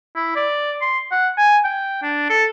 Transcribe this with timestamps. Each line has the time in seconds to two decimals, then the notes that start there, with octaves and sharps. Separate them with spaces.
0.16 E4
0.36 D5
0.81 C6
1.12 F#5
1.37 G#5
1.65 G5
2.03 D4
2.30 A4